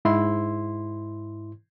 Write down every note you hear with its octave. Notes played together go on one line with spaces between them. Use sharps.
G#2 E4 C6